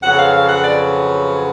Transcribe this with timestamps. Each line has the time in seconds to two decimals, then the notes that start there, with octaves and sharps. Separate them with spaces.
0.03 F2 C#3 F#3 B3 F#5
0.18 F5
0.34 F5
0.49 F#5
0.63 D5